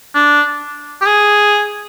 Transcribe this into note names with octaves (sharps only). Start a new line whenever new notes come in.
D4
G4
G#4